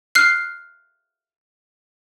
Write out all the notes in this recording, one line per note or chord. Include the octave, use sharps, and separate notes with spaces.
F6 F#6 C7